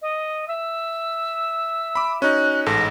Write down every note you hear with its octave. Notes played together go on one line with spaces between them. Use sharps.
D#5
E5 E6
B5 D6
C#4 D#4 F#4 F#6
A1 G#2 A4 A#6